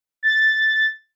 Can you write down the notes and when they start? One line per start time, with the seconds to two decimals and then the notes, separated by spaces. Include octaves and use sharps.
0.23 A6